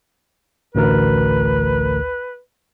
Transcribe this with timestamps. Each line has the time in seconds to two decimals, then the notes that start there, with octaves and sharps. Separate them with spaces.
0.75 A1 D2 A#4 B4